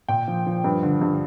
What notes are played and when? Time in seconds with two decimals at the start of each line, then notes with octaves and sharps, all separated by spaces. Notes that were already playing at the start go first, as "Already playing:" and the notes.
0.08 A#2 G5
0.28 F3
0.46 F3
0.64 G2
0.83 D3
1.02 G2